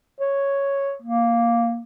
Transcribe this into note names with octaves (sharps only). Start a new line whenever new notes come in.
C#5
A#3